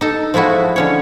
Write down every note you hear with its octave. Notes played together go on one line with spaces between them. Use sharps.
D#4 A4
F3 G#3 A3 E4 F#4
D3 C#4 C#5